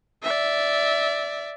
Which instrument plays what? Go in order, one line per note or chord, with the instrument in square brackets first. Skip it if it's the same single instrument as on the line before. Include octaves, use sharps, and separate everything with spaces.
[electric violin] D5 E5